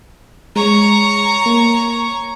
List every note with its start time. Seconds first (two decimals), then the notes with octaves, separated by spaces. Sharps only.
0.56 G#3 C#5 A#5
1.46 A#3